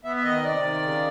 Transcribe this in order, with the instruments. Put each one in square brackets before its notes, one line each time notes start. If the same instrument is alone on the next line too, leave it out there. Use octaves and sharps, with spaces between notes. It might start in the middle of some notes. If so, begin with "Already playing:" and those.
[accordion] B3 E5
E5
D#3 D#5
C3 D5
D#3
C#3